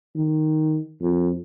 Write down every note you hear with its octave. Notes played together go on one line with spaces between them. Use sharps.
D#3
F2